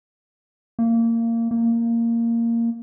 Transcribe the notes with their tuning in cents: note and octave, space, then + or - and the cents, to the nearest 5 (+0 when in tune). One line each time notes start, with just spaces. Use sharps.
A#3 -20
A#3 -10